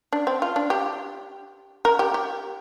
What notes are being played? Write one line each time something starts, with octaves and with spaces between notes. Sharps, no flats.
D4
C4
F4
D4
G4
A#4
G4
G4